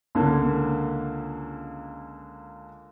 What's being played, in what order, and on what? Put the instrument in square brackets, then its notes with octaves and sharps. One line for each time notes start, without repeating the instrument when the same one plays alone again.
[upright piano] C#2 D3 A#3